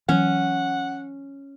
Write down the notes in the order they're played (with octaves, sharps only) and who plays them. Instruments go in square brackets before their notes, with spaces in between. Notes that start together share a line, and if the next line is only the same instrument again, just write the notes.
[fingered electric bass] E3 F#3 [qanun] C#4 [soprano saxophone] F#5